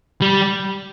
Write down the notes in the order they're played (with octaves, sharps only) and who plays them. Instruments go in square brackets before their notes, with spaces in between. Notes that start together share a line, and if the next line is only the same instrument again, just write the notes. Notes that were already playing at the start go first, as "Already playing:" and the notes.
[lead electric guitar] G3